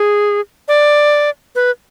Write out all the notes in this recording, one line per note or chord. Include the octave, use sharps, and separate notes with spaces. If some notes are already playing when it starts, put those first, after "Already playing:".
Already playing: G#4
D5
B4